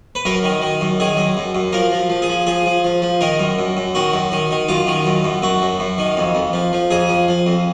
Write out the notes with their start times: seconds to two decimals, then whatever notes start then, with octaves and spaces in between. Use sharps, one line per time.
0.15 B4
0.25 F#2 A#4
0.44 D#3
0.62 D#3
0.81 F#2
1.00 D#3 G#4
1.17 F#2
1.37 F#2
1.55 F#2
1.73 F3 A#4
1.92 F3
2.10 F3
2.22 G#4
2.29 F3
2.47 F3 G#4
2.66 F3
2.84 F3
3.02 F3
3.21 D#3 A#4
3.40 F#2
3.59 F#2
3.77 F#2
3.95 D#3 F#4
4.14 F#2
4.32 D#3
4.51 D#3
4.69 F#2 F4
4.87 D#3
5.06 F#2
5.24 F#2
5.42 F#2 F#4
5.62 F#2
5.80 F#2
5.98 D#3
6.17 F2
6.35 F2
6.53 F3
6.73 F3
6.91 F2 G#4
7.09 F3
7.28 F3
7.47 F2